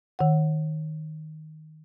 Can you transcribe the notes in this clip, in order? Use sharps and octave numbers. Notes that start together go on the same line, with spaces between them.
D#3 F#5